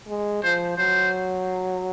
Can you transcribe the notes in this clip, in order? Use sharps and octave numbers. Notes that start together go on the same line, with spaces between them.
G#3
F3 C5
F#3 C5